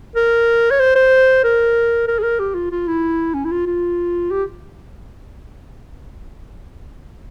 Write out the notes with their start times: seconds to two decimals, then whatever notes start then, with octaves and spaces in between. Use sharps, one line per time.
0.15 A#4
0.71 C#5
0.80 C5
0.95 C5
1.44 A#4
2.08 A#4
2.19 G#4
2.23 A#4
2.39 G4
2.55 F4
2.71 F4
2.87 E4
3.34 C#4
3.45 E4
3.51 F4
3.66 F4
4.31 G4